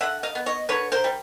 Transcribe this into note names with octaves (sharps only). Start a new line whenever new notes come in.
D3 E5 F#5
D#5 F5
B3
C#5 D#5
D3 B4 C#5
A#4 C5
G3